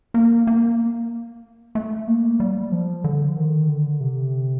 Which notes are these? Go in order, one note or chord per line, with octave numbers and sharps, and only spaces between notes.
A#3
A#3
A3
A#3
G3
F3
D3
D#3
D3
C3